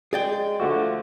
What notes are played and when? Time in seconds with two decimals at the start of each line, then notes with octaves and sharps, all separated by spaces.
0.13 G#3 G#4 D5 G5
0.60 D3 F3 A3 F#4